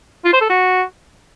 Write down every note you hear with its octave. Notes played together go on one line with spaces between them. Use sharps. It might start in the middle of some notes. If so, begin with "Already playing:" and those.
F4
C5
A4
F#4